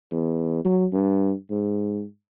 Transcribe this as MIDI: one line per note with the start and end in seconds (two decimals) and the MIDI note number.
0.11 0.61 40
0.65 0.86 54
0.93 1.33 43
1.50 2.03 44